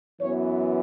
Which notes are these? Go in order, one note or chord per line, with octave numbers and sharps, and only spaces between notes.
F#2 E3 B3 C#5